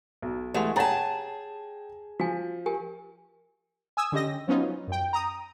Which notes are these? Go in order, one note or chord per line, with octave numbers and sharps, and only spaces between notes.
B1
E3 G#3 A3 G4 F#5 C6
G4 G#4 C#5 F#5 G5 A5 A#5 A6
F3 F#4 G#5
G4 A#4 G#5
G#5 D#6 E6
D3 C#4 G4 D#5 A#6
F3 F#3 B3 C#4 D#4 F4
F#2 G5
A#5 D#6